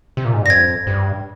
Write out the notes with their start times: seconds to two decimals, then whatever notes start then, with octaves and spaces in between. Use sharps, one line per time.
0.17 C3
0.25 A#2
0.33 G#2
0.42 G2
0.46 A#6
0.50 F2 G#6
0.87 G2